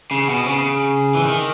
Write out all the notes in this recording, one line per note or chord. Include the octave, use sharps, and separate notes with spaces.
C#3
B2
C#3
E3
D#3